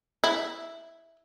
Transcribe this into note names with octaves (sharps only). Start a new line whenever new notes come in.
E4